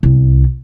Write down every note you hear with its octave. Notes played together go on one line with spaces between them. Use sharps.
C2